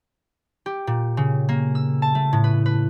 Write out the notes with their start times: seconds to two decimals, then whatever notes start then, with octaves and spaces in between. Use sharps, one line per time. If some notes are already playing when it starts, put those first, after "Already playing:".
0.66 G4
0.87 A#2
1.17 C#3
1.49 A#3
1.75 E6
2.02 A5
2.15 A3
2.33 A2
2.44 B4
2.66 B4